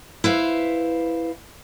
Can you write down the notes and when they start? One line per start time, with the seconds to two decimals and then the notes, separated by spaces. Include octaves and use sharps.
0.24 E4 B4 C5 F5